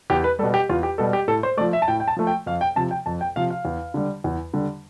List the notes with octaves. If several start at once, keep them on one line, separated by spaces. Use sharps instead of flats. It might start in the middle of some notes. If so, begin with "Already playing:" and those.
E2 G4
B4
B2 G3 A4
G4
E2 F4
G4
B2 G3 A4
G4
A2 A4
C5
F3 A3 D5
E5
A5
A2 G5
G5
A5
F3 A3
G5
F2 F5
G5
C3 F3 A5
G5
F2 A5
G5
C3 F3 F5
F5
E2
D3 G3
E2
D3 G3